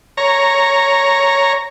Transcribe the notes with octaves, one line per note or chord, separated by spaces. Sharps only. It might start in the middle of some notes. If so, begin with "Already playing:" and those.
C#5 A#5